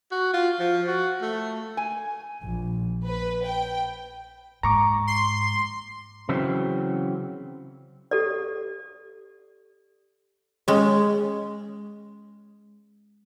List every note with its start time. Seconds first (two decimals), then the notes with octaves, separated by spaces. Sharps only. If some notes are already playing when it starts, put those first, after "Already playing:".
0.11 F#4
0.33 F4
0.59 F3
0.87 F#4
1.21 A3
1.77 G#5
2.41 A#1
3.06 B4
3.45 G5
4.63 G#2 A#5 C#6 D6
5.07 C6
6.29 C#3 E3 F#3 C4
8.11 G4 A4 D5
10.68 G#3 C#4